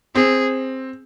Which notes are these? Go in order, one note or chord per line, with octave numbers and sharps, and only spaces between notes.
C4 G#4